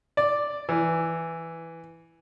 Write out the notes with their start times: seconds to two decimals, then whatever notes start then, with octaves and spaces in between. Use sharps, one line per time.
0.17 D5
0.69 E3